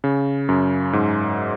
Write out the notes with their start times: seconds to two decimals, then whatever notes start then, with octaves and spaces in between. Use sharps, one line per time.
0.04 C#3
0.49 F#2
0.93 G#2